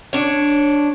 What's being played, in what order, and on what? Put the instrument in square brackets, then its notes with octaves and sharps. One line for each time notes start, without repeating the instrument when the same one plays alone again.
[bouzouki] D4 C#5